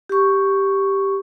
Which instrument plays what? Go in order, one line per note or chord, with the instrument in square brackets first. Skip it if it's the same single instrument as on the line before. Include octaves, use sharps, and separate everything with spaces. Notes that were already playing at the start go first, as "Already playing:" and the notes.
[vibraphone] G4 C#6